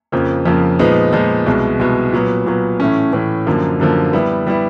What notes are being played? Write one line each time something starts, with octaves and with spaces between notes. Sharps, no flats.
F2 C#3 F3 A#3
F2 C#3 F3 A#3
A#2 F3 G#3 B3 D#4
A#2 F3 G#3 B3 D#4
C2 B2 G#3
C2 B2 G#3
A#2 F#3 B3
A#2 F#3 B3
A2 E3 A3 C#4
A2 E3 A3 C#4
F#2 D3 F3 A#3
F#2 D3 F3 A#3
G3 B3 E4
G3 B3 E4